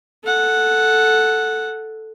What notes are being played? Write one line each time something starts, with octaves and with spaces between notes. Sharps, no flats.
A4 F#5